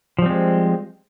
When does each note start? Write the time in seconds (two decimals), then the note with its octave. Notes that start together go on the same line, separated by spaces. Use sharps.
0.19 F3
0.22 G3
0.26 C4
0.29 G#3